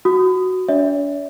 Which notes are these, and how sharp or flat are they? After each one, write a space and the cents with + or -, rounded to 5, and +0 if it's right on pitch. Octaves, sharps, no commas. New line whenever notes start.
F#4 +0 D#6 -5
D4 -40 C#5 +45 E5 -25